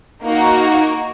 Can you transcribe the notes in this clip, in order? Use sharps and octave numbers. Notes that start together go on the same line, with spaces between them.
A#3 D#4 F#4